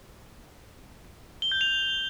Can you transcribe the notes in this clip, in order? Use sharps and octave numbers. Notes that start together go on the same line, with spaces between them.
G7
G6
F7